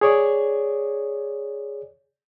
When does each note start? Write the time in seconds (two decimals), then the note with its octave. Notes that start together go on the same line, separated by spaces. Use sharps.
0.01 G#4 C#5 D5